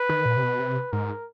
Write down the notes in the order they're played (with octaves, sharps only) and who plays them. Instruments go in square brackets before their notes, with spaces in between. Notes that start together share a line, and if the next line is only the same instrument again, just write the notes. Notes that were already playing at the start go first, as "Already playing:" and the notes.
Already playing: [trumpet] B4
[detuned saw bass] D#3
A#2
C3
B2
C3
[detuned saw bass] G#2 [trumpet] A#4